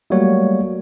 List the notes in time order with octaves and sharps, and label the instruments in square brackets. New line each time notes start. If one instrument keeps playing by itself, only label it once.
[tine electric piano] F#3 G3 A3 A#3 F#4 C#5